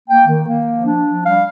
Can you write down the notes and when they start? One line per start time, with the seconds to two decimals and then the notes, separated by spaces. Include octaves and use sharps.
0.08 A#3 G5
0.28 D#3
0.47 A#3
0.67 F3
0.86 D4
1.05 F3
1.25 G3 F5